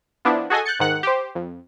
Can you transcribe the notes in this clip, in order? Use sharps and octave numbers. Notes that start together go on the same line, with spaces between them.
F3 B3 D4 E4
F#4 G#4 A4 D#5 G#5
F#6 G6 A6 C#7
G#2 D#3 F#5 F#6
G4 C5
F2